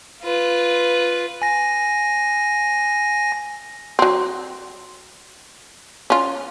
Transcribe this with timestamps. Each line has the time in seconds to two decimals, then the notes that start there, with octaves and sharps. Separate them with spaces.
0.23 F4 B4
1.42 G#5 A#6
3.99 F#3 C4
6.10 C#4 F4